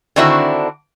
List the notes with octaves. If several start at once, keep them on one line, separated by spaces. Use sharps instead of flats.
D3 D#3 C4 D4 E4 F#4